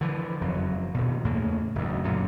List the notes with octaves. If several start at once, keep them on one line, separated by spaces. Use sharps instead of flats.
D3 E3 F3
F#1 F2 F#3
D#1 D2 B2
E2 A2 C#3 A#3
F#1 D2
F#2 A#2 D3